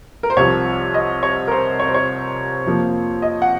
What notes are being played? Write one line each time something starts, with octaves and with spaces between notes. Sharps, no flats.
A#4
C5
C2 C3 F3 C4 C#5
D#5
C#5
A#4
C5
C#5
C5
C#5
F2 C3 F3 A#3
D#5
F#5